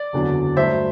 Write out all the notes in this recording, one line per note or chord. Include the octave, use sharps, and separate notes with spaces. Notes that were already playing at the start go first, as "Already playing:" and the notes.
Already playing: D5
F#1 E2 D3 F#3
G2 F#3 A3 C5 E5